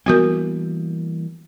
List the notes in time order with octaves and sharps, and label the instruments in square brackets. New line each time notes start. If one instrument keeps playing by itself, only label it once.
[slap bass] E3 G3 A#3 [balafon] B3 F#4 A#4